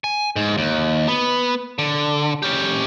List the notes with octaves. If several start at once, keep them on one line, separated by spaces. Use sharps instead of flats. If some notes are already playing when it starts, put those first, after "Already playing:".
G#5
G#2
D#2
B3
D3
C#4 G4